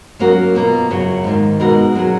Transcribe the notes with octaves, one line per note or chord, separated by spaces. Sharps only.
F#3 A#3 C#4 F#4 A#4
B2 A#3 F4
F#2 C#3 F#3 C#4 F#4
G#2 D#3 A#3
B2 G#3 D#4 F#4 A#4
A#2 F#3 C#4 G#4